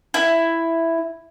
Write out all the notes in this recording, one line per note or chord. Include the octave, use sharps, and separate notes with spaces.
E4